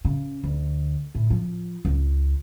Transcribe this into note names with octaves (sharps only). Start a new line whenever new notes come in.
C#3
D2
A2
F3
C#2